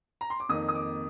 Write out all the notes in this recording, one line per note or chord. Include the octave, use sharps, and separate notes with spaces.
A#5
C6
D6
F2 D#3 A#3 D#4 D#6
D#6
D6